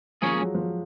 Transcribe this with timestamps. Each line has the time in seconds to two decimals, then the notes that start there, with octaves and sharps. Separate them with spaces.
0.22 F3 A#3 C#4 G#4 C#5
0.33 G#3
0.41 F#3
0.55 F3
0.59 F#3